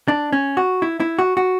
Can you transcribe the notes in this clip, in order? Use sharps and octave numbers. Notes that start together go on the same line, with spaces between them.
D4
C#4
F#4
E4
E4
F#4
F#4